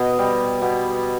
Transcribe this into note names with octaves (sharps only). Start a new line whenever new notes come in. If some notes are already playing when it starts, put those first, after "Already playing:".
Already playing: B2 D#5
G3
B2